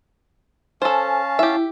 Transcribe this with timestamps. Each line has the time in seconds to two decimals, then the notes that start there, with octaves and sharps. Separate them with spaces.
0.82 C#4 A4 C5 F5 G#5 A5
1.39 E4 G4 E5